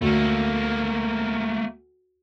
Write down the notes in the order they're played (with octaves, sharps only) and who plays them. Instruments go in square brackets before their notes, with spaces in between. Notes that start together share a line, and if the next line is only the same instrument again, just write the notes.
[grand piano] D2 [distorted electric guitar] A3 A#3